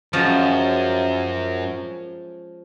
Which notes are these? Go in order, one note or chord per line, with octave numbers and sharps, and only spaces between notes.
F#2 F3 G#3 C#4